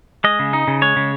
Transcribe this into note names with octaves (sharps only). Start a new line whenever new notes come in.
G#3 D#5
C#3
D#4
C#3
G#3 C#5
C#3